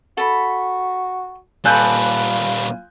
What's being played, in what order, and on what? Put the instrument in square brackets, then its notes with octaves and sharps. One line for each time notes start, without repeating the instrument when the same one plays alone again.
[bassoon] F#4 [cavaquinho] A4 B5
[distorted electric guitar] A#2 G3 [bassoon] F4 [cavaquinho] A4 B4 [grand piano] G#5 F#6 G6